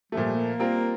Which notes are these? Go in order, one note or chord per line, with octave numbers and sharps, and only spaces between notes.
A#2 F3 G3 A3
A#3
G3 C4 F4 A#4